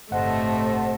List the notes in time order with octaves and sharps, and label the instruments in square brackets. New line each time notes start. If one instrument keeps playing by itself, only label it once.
[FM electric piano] G1 F#5 [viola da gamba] A2 C3 A3 [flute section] C5 D#5 A5